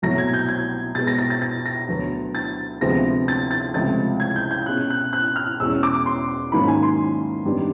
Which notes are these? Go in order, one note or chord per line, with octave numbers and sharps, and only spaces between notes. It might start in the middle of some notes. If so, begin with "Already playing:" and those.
C2 B2 F#3 A3 A#6
G#6
G6
G#6
B2 G#3 B3 A6
A#6
A#6
A6
A6
A#6
D2 D3 F#3 B3
A6
D2 C3 F3 G#3 B3 A#6
A6
A6
C#2 C3 F3 A3 A6
G#6
G6
G6
B2 G#3 C#4 F#6
F#6
F#6
F6
E2 B2 G#3 C#4 E6
D6
C6
G#2 D#3 F#3 A#3 C#4 B5
G#5
C6
F#2 D#3 G3 B3 D4